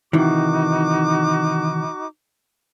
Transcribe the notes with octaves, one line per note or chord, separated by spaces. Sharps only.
C3 D#3 E3 D#4 F#4 D6